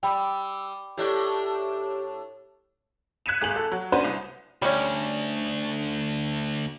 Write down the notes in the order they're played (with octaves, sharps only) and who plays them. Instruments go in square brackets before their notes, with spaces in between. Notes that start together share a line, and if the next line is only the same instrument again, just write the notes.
[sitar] G3 [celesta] G5 B5 [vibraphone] E6
[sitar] A2 D4 [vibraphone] G4
[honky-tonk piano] F#6 G#6 B6 C#7 D#7 E7
G#1 G#4 F#7
A4
F#3
C#4 D4 F#4 B4 C5
C2
[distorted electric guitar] D2 [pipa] G3 C#4